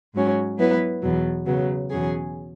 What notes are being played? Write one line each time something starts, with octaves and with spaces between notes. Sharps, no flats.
G#2 F#3 C#4
F#3 B3 E4 B4
E2 B2 F#3
C#3 F#3 B3
E2 B2 F#3 C#4 G#4